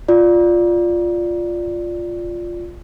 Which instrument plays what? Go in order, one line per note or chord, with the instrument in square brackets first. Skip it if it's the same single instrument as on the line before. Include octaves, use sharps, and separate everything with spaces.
[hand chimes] F4 D5